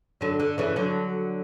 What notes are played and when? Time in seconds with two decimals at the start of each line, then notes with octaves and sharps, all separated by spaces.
0.21 D3 F#3
0.39 D3
0.58 C#3 E3
0.76 D3 F#3